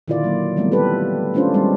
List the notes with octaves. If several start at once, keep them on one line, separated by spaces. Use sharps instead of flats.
A#2 D3 D#3 E4 F4 D5
F#3 A#3
E3 G3 A3 B3 C4
G4 A4 B4
A3 C#4 D4 F4 C5
G3 G#3 C4